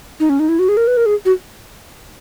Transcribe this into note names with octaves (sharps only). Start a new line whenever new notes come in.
D#4
C#4
D#4
E4
F#4
G#4
A#4
B4
A#4
G#4
F#4